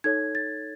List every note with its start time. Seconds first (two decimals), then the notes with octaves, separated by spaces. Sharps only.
0.04 D#4 A4 C#5 G#6
0.35 A6